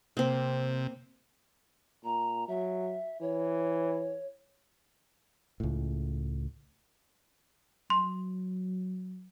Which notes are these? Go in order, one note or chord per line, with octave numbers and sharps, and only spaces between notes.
C3 A#3 C4
A#2 A#5
F#3 E5
E3 C#5
C#2 A2
F#3 C6